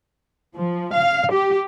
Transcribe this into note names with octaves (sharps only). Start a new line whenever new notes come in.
F3
F5
G4